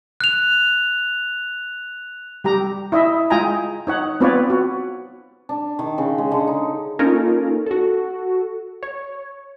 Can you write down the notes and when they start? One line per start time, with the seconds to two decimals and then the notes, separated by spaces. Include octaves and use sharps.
0.20 F#6 F7
2.44 G3 G4 A#5
2.92 E4 D#5 E5
3.30 G#3 F4 D#5 G5 G#5 A#5
3.87 D#4 C#5 F#5
4.20 B3 C4 F4 B4 C#5 D5
4.50 F#4
5.49 D4
5.79 D#3
5.98 C#3
6.18 G#3
6.31 D3
6.47 D#4
6.99 A#3 C#4 D#4 F4 A4 A#4
7.66 F#4 A4
8.83 C#5